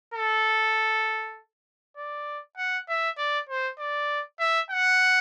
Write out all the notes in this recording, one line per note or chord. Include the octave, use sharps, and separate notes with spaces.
A4
D5
F#5
E5
D5
C5
D5
E5
F#5